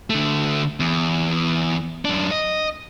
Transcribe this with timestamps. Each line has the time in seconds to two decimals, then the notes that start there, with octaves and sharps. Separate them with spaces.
0.10 D3 A3
0.80 E2
2.05 F#2 D4
2.31 D#5